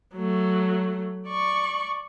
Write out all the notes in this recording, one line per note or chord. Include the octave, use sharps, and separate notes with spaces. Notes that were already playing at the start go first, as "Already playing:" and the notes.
F#3 A3
D5 C#6